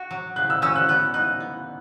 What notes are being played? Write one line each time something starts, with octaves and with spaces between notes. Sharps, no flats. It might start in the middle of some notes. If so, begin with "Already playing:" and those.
Already playing: F#4
F#3
C#3 F#6
E6
C#4 E6
F#6
B3 F#6
D#4 F#6
B3